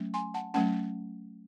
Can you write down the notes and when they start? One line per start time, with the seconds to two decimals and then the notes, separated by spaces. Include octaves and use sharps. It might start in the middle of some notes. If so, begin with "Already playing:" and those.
Already playing: F#3 A3 C#4
0.14 G#5 C6
0.34 F#5 A5
0.54 F#3 A3 C#4 F#5 A5